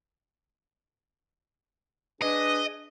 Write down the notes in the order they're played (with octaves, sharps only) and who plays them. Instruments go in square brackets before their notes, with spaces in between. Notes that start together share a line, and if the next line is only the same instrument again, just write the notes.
[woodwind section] D4 G#4 B4 [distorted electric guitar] D#5